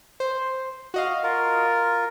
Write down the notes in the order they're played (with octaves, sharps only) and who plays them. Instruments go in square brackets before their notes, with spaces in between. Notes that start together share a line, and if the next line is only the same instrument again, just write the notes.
[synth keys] C5
F#4 D#5 F5
[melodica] F4 A#4